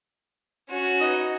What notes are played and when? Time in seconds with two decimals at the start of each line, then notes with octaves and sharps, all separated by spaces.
0.69 C#4 F#4
1.00 D#4 B4 D#5